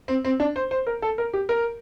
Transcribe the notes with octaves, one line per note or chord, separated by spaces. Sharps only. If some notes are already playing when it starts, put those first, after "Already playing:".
C4
C4
D4
C5
C5
A#4
A4
A#4
G4
A#4